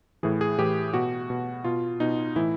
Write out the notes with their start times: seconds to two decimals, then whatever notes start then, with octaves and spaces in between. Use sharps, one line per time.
0.23 A2 E3 G#4
0.41 G#4
0.58 A2 E3 G4
0.94 B2 F#4
1.30 B2
1.64 B2 F4
2.00 B2 D#4
2.36 A2 E3 E4